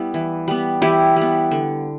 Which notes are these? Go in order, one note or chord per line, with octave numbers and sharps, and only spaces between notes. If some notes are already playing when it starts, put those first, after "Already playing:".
Already playing: G3 B3 E4
E3
G3 B3
E3 E4 G4
G3
B3
D3